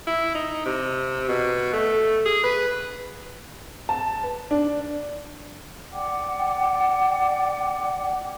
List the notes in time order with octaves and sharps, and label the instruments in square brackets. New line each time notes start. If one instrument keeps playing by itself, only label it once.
[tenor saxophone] E4
D#4
C3
B2
A3
G#4
B4
[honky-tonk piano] A5
B4
D4
[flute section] D5 F#5 G5 D6